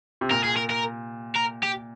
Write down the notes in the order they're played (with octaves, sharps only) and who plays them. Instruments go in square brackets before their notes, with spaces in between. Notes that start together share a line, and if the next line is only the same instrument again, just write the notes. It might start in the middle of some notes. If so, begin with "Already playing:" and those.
[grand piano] C3
[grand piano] A#2 [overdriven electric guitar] A#4
[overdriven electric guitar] G#4
A#4
A#4
A#4
G4